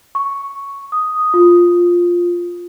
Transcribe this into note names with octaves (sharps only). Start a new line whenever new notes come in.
C#6
D#6
F4